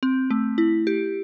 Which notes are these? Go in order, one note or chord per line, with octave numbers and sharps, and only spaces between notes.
C4
A3
E4
G4